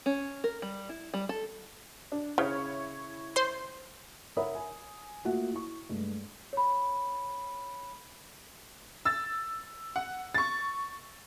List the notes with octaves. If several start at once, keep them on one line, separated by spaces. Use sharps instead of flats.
C#4
A#4
G3
E4
G3
A4
D4
C#3 E4 C#5
C5 C6
A#4 C#5 E5 F#5 B5 D#6
G#5
A3 A#3 F4 F#4 E5 F#5
E4 C#6
G2 G#3 A3
C#5 B5
E6 A6
F#5
C#6 A6